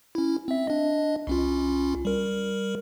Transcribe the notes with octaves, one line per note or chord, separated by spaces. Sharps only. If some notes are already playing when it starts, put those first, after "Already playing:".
C#4 E4
C4 E5
D4 D#5
C2 C#4 F4
G3 A#4